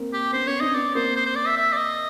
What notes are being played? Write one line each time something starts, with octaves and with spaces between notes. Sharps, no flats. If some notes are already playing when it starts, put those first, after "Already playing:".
Already playing: A#3 C4
G4
B3 C#4 C5
B3 C#4 C#5
C4 D4 D#5
B3 C#4 D5
A#3 C4 C5
C5
C5
D5
E5
E5
D5
D#5